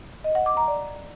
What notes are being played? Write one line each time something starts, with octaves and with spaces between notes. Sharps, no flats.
D#5
F#5
D6
A#5
D5